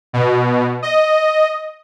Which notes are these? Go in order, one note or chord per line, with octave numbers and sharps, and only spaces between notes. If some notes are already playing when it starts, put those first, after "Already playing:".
B2
D#5